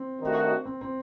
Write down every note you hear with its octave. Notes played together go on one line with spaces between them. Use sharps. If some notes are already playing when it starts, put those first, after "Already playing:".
Already playing: C4
G2 D#3 A3 D#4 F#4
C4
C4